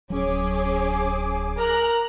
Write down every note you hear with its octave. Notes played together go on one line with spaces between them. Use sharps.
D1 F#3 C#4 G#4 D6
A#4 A#5 F#6